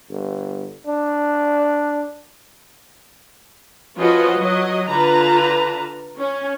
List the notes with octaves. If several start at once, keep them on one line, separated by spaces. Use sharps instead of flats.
G1
D4
F3 C#4 F4 F#4 B4 D#5
F#3 D#5
D3 F4 B4 A5 A#5
C#4